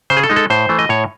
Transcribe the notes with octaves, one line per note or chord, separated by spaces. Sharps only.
C#3 C5
G#4
A4
G#3 D#4
A4
A2 C5
E3 A3
D#5
A2 C#5